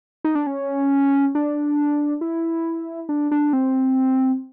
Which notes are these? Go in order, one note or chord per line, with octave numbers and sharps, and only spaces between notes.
D#4
D4
C#4
D4
E4
D4
D4
C4